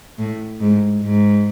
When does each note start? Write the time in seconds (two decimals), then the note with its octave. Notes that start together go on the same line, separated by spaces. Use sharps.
0.18 A2
0.60 G#2
1.02 G#2